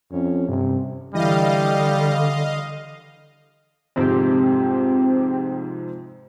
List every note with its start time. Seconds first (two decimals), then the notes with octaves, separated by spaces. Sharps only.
0.11 F2 C#4
0.48 G2 C3
1.15 D3 E3 G3 D#5 F5
3.96 F2 G#2 C3 C4 G4